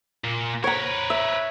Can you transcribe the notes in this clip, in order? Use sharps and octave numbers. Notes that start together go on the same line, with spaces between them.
A#2 A#3
A#4 B4 C#5 A#5
E5